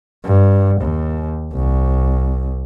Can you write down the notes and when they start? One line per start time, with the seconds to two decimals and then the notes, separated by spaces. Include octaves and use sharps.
0.25 G2
0.81 D#2
1.53 C2